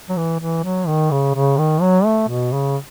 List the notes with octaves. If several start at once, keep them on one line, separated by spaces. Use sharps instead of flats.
F#3
E3
E3
F#3
D#3
C#3
C#3
D#3
F#3
A3
B2
C#3